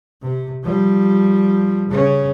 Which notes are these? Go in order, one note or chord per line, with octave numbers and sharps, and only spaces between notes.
C3
F3 G3
C#3 C#4